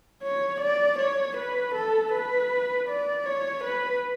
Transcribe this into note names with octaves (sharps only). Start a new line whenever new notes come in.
C#5
D5
C#5
B4
A4
B4
D5
C#5
B4